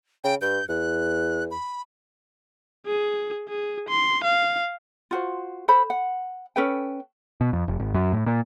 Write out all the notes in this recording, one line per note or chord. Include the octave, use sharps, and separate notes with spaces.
C#3 G5
G2 G6
E2 F#6
B5
G#4
G#4
C6
F5
F4 F#4 C5
A4 C5 B5
F#5
C#4 A4 B4 G5
B2
F2
F1
G#1
F#2
A2
A#2